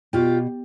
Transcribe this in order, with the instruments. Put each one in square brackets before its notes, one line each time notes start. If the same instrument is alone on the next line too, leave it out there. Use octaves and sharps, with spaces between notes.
[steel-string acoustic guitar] B2 F4 G4